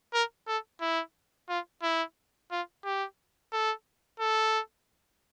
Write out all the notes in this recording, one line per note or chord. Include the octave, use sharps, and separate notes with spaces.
A#4
A4
E4
F4
E4
F4
G4
A4
A4